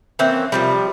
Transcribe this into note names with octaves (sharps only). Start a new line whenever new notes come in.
E3 A#3 C4 C#4
C3 F3 G3